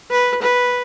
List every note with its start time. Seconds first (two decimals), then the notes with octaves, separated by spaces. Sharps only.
0.11 B4
0.42 B4